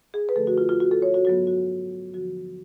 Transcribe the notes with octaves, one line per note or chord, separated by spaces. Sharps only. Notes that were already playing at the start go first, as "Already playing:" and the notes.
G#4
B4
F#2 D3 F3 A3 A4
F#4
F4
F4
F#4
A4
C#5
F#4
G#2 F#3 B3 F#4
F#4
D2 D3 F3 F#4